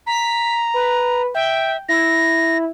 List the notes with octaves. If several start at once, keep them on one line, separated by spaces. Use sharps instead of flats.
A#5 B6
B4
E5 G5
E4 A#6